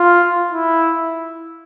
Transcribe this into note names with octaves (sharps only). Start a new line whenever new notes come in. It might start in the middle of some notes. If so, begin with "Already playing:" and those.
Already playing: F4
E4